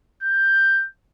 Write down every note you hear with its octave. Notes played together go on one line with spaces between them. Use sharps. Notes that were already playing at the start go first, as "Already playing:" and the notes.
G6